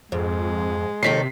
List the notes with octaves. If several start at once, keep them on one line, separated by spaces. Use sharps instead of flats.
F2 G#2 G#3
D#2 C3 D#3 A4 B6 C7